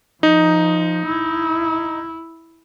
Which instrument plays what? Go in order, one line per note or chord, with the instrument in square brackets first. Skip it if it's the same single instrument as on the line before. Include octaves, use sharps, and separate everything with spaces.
[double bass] F3 [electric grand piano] D#4
[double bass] E4